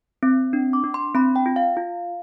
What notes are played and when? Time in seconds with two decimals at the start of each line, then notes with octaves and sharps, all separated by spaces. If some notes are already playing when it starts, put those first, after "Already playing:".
0.23 C4
0.53 D4
0.73 D6
0.84 D4
0.94 C6
1.15 C4 B5
1.36 G5
1.46 F4
1.56 F5
1.77 F4